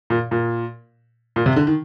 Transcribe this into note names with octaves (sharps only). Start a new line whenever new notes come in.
A#2
A#2
A#2
C3
D3
D#3